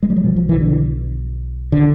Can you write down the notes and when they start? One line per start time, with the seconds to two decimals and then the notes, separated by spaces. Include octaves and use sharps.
0.03 G#3
0.10 G3
0.16 F#3
0.24 B1 B2 F3
0.36 F3
0.49 E3
0.61 D3
1.72 D3